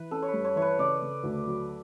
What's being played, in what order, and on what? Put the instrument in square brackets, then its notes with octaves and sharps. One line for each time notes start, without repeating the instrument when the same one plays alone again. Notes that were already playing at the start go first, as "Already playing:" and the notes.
Already playing: [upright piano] E3 [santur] B4
[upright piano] C#4 [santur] A4
[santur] C#5
[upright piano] G2 [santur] B4
[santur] C#5
[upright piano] E3 [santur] C#5
[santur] B4
[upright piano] C#3 [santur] D5
[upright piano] C#3
D2
F#3